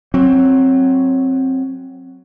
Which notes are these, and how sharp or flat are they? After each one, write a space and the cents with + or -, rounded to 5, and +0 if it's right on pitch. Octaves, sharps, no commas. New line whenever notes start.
F#3 +0 C4 +15